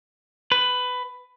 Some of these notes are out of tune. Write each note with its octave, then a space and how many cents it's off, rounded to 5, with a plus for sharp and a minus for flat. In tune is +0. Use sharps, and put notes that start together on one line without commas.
B4 +15